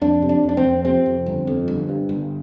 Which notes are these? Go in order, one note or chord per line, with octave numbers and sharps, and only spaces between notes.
F2 D4
C3
D4
F2
D4
C4
F2
C3 C4
F2
G1
F2
G1
G2
G1